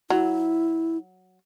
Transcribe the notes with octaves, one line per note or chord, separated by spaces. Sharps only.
F#3 E4